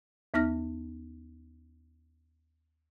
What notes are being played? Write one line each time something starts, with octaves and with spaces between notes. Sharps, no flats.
D#2 B3 D#4 F6 A#6